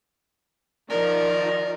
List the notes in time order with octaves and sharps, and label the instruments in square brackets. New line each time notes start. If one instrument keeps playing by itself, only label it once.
[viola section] D#3 F3 [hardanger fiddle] A#4 [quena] D5